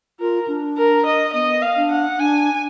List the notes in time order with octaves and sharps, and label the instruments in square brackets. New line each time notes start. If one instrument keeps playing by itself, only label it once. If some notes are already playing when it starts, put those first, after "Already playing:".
[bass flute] F4 [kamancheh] A#4
[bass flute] D4
[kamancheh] A#4
D#5
[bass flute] B3 [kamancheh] D#5
[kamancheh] F5
[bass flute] D4
[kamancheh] F#5
[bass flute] D4 [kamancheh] G#5